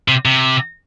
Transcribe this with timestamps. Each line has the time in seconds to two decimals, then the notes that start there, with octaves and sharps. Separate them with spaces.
0.08 C3
0.25 C3